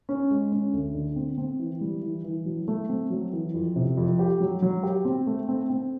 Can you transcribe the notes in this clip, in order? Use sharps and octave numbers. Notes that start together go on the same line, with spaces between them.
C#4
G#3
C#4
D2
D3
C4
C4
E3
G3
E3
E3
F#3
A3
C4
F#3
E3
F2
C3
F2
G4
F#3
F#3
G4
C4
A3
C4
C4